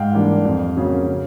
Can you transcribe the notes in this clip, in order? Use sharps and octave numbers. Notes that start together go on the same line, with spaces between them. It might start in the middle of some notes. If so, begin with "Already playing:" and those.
Already playing: G#2 F5 G5
E3 G3 A#3 D4
F2
C#3 F#3 A#3
C#3